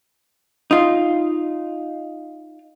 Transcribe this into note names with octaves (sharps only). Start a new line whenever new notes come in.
D#4 F4